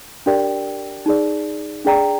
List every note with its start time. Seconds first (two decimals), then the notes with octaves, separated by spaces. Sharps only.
0.26 D4 G4 A#4 D5 G5
1.06 D#4 G#4 D5
1.85 D4 G#4 D5 G5 A#5